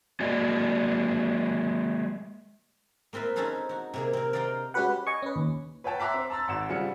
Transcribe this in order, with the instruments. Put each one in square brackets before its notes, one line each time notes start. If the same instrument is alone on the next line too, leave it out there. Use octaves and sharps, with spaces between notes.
[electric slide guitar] G#3 A#3 F#4 D5 D#5
[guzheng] A#3 C4 F4 B4 E5
C4 C#4 D#4 G#4 A4 B4
D#4 F#4
C3 A#3 G#4
C4 A#4
A#4 D5 D#5 F5 G5 A#5
[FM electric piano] G#3 C#4 F#4 G4 B4 F#5
B4
D#5 G#5 C#6
C#4 B4
D#2
[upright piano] B4 C#5 F#5 G5 A5
E5 A#5 C6 D6 F#6 B6
C4
A5 A#5 C6 E6 A6
G#1 F#5 E7
C#3 F3 G3 F#5 G#5 C#7